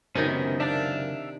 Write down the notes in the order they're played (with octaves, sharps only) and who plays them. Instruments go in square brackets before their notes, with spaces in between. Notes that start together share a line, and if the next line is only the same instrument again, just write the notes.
[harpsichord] C#2 F#2 [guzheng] C3 D#3 D#4 [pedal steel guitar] B3 C#4
[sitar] D4 [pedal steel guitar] E5 F5 A5